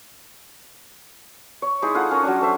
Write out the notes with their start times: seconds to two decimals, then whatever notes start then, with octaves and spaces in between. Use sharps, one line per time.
1.62 C#5
1.82 G#3 D#4 E4 G#4
1.94 F4 G#4 A4 F#5
2.11 C#4 A#4 A#5
2.23 F#3 C#4 D4
2.41 A4 C5 E5